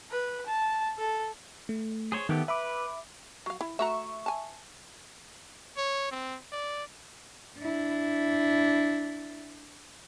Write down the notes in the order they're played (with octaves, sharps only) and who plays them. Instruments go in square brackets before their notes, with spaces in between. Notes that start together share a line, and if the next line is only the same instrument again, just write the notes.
[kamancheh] B4
A5
A4
[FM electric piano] A3
[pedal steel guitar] G#4 C5 C#5
[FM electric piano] D#3 [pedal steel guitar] A3 B3 G4
[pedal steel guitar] B4 [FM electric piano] E5 B5 D6
[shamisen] F#3 F5
E4
[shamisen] A3 F#4 A#5 [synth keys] E5 C#6
[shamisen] G#5 A5
[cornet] C#5
C4
D5
[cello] D4 E4